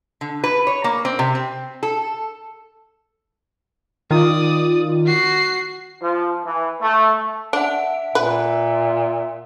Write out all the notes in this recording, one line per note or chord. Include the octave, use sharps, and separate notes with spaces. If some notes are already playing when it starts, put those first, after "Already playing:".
D3
B4
C#5
A#3
C4
C3
C4
A4
D#3 F4 D5 D#6
F#4 C7
F3
E3
A3
D4 E5 F#5 D7
A#2 B4